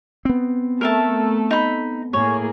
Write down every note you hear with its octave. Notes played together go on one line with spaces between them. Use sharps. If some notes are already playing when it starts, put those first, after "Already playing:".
B3 C4
A3 A4 A#4 E5 A5
D#4 B5
A2 A#3 G#4 C#5